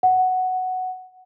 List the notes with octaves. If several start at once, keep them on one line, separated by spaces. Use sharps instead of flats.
F#5